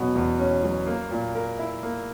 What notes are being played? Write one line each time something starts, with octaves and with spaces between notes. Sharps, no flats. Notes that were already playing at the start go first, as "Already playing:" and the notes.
Already playing: E2 B2 F#3 C#4
E2
C#4
F#3
A#3
A#2
A#4
E4
A#3